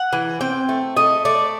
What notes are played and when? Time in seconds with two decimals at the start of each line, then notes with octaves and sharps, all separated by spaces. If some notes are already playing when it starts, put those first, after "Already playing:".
Already playing: F#5
0.13 E3
0.41 C4 G5
0.69 A3
0.97 A3 D#5
1.25 A3 D5